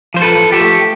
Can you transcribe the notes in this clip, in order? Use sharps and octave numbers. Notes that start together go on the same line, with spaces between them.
F3 C5
A4 B4
F3
G4 A4
A3